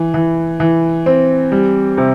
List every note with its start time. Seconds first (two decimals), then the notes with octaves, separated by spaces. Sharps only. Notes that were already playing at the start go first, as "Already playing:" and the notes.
Already playing: E3
0.14 E3
0.60 E3
1.06 C4
1.52 G3
1.98 C3